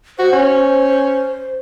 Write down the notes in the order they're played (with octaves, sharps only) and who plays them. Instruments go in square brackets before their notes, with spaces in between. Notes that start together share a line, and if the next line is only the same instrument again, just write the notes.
[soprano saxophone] F#4 [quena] C5
[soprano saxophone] C#4